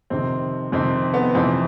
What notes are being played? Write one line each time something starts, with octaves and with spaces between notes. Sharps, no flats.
F2 C3 D#3 C4
F2 C3 D#3 C4
B3
F2 C3 E3 C4